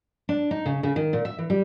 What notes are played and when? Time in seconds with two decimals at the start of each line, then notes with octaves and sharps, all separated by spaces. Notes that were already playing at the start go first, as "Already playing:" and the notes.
0.29 D4
0.51 D#4
0.66 C#3
0.83 C#3
0.96 D#3
1.13 A#2
1.25 E5
1.39 E3
1.50 G3